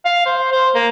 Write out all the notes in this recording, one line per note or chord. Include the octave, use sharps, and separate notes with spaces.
F5
C5
C5
A#3